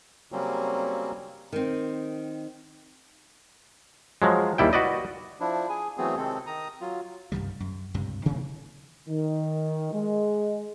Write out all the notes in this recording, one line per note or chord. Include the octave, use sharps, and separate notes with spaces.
C#3 F#3 G3 A#3 C4 C#4
D#3 C4
F3 F#3 G#3
D#2 G3 E4 G5
F#4 B4 D5 D#5
F3 D4 E4
G#4 G#5
E3 F#3 A3 B3 C4 G#4
C3 D#3 G#3 C4 A4
D#3 A#5 D#6
F#3 F4
C2 G2 D#3 G3
F#2
C#2 G2 C3
C3 D#3 E3 A#3
D#3
G#3